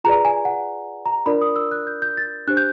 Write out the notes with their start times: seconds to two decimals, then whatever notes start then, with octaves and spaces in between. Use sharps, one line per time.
0.04 F4 G#4 B4 D5 A#5
0.25 G#5
0.45 F#5
1.06 A#5
1.26 D4 F4 A#4 D5 B5
1.41 D#6
1.56 E6
1.71 F#6
1.87 G6
2.02 G6
2.17 A6
2.47 D4 G4 C5 F#6
2.57 G6